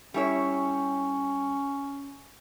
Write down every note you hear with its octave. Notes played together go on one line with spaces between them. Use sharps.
G3 C#4 E4 C#5